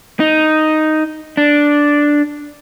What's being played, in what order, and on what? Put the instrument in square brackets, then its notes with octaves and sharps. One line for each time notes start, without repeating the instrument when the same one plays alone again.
[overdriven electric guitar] D#4
D4